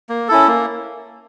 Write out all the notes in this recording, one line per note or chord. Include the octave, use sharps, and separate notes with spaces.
A#3
C#4 E4 A4
A#3